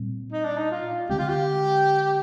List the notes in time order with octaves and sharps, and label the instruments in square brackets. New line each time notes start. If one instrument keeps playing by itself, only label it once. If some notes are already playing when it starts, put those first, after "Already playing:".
Already playing: [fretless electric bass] A#2 G3 C4
[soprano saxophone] D#4
D4
D#4
F4
[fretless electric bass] D3 G#3 C4 [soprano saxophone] G4
[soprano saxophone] F4
G4